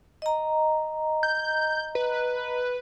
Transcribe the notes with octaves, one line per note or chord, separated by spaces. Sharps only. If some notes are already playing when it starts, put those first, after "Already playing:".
D#5 A#5
G6
B4